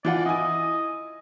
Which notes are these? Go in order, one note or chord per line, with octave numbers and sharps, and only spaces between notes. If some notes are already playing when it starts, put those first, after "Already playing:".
E3 F4 D5 F#5
E4 D#5 G#5